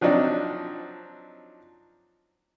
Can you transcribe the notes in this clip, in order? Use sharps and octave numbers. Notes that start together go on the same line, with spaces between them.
F3 F#3 C4 D4 D#4